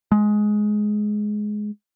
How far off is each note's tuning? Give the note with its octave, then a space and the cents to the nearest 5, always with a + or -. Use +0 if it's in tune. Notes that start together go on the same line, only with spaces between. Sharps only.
G#3 +15